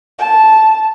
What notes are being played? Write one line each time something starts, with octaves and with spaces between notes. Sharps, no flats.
A5